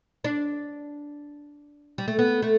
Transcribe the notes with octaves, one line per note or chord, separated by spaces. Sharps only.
D4
G3
A3
B3
A3